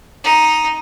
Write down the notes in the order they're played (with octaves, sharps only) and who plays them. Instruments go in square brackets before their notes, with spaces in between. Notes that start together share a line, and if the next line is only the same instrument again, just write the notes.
[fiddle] D#4